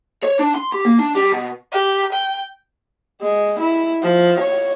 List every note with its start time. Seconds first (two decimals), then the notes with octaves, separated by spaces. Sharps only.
0.23 C#5
0.39 D4
0.55 C6
0.72 G4
0.85 A#3
0.99 D4
1.15 G3
1.32 B2
1.72 G4
2.12 G5
3.21 G#3
3.60 E4
4.02 F3
4.40 C#5